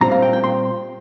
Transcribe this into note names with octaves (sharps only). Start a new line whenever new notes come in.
A#2 G3 C4 F4 A#5
F5
G5
G5
C6